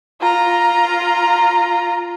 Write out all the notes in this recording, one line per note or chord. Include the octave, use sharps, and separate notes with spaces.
F4 A#5